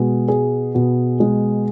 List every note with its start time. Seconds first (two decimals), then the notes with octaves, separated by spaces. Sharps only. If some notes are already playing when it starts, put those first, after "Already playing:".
Already playing: B2 G#3
0.28 G#4
0.75 B2
1.20 G#3